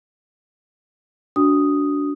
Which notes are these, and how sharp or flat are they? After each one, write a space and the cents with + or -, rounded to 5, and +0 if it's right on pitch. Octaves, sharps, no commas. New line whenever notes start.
D4 -20 F#4 +0 D#6 +0